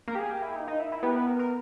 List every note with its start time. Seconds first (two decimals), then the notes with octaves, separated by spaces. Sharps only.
0.08 A#3 A#4
0.15 G4
0.19 G#4
0.31 G4
0.42 E4
0.56 D#4
0.67 D#4
0.79 E4
0.92 E4
1.03 B3 G4
1.11 A#4
1.16 B4
1.27 A#4
1.39 A#4